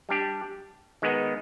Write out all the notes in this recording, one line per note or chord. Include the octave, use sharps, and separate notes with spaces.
G3 D4 G4
D#3 G#3 B3 D#4